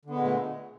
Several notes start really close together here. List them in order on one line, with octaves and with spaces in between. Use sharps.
D3 B3 G#3 A#2 A3